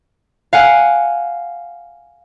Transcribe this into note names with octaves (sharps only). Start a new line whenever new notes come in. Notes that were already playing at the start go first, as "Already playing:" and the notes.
F5 F#5 G#5